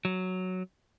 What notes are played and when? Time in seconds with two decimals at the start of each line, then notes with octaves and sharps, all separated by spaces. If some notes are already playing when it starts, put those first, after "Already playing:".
0.05 F#3